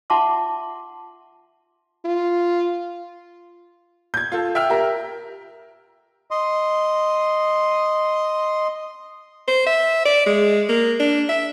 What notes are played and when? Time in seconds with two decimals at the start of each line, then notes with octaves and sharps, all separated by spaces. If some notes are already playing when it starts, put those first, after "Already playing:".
0.10 F4 E5 F#5 A5 C6 D6
2.05 F4
4.14 G6 G#6
4.32 F4 A4
4.55 E5 G5 F6
4.70 G4 A#4 E5 A#5
6.31 D#5 C6
9.48 C5
9.67 E5
10.05 D5
10.26 G#3
10.69 A#3
11.00 D4
11.29 E5